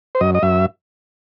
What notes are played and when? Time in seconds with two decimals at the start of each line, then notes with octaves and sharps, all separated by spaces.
0.15 C5
0.21 F#2 D#5
0.35 D#5
0.42 F#2 E5